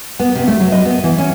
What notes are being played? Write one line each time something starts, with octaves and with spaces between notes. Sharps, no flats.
B3
C3
A3
F#3
D#5
B3
E3
C#4